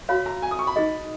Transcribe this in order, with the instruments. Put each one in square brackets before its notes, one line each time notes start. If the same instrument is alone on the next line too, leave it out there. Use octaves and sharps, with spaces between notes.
[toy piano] F#4 C#5 F5 [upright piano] B5
[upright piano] A#5
G#5
D#6
C#6
B5
[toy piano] D#4 G#4 D#5